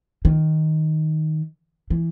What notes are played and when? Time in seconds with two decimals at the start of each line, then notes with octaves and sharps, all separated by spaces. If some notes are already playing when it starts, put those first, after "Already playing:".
0.25 D#3
1.90 E3